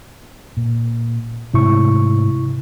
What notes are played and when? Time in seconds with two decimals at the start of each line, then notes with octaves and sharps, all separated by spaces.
0.57 A#2
1.54 G#2 C3 G#3 A3 E4 C#6